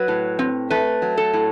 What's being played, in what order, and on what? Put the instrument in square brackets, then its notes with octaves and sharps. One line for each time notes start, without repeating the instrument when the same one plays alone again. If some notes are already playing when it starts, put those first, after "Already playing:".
Already playing: [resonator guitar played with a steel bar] F#3 B4
A2
C4
A3 B4
F#3
A4
A2